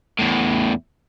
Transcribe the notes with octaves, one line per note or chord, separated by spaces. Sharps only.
E2 A2